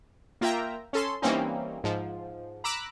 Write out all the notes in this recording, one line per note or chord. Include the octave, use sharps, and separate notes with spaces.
A#3 F4 E5 G5 A#5
C#4 A4 C6
E3 G3 A#3 C4 C#4 D#4
G#2 F3
A#5 B5 D6 E6 F#6